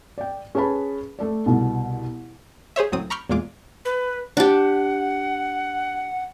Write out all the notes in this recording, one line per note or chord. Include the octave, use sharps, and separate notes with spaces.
D5 G5
C#4 G#4 B4 A5 B5
A3 A4 D5
C2 B2
G#4 C5 C#5 E5
C#2 A2 F#3 C4 D#6
A#5 B5 C#6 D6 F6 G6
E2 A#2 G#3 F4 D6
B4
D4 G4 F#5